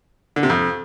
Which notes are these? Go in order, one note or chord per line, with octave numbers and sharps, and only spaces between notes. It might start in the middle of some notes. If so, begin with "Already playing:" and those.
D3
C3
F2